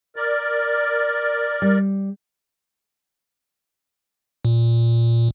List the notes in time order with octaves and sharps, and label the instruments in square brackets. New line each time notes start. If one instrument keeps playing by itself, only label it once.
[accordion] A#4 D5
[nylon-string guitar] G3
[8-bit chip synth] A#2